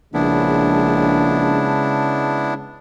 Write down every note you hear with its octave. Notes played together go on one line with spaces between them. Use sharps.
A#1 C#3 G#3 B3 D4 E4 A5